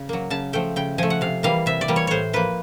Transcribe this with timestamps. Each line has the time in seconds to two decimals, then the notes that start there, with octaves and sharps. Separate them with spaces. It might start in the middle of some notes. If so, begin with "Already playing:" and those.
Already playing: C#3
0.09 F#3 A#3
0.30 C#3 A5
0.53 F3 A3 G5
0.76 C#3 G5
0.98 F3 A3 G#5
1.10 F#5
1.21 C3 F5
1.43 E3 G3 A#3 F5
1.66 C3 E5
1.81 D5
1.88 E3 G3 A#3
1.96 C#5
2.07 A2 C5 C#5
2.33 F3 A#3 B4